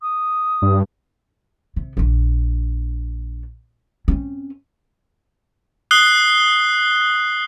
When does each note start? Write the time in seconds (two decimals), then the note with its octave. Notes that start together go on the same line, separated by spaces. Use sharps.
0.01 D#6
0.62 G2
1.76 C3
1.97 A#1 D4
4.08 C4 C#4
5.91 D#6 F#6 C7 G7